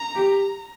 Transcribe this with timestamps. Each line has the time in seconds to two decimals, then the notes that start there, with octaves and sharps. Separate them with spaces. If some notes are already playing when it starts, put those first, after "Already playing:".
Already playing: A#5
0.15 G4